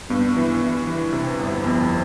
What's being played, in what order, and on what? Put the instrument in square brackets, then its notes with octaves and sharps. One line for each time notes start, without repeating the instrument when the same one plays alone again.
[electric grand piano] G2 [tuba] B3
[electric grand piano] E3
E3
E3
C3
G1
[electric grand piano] F2 [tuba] B3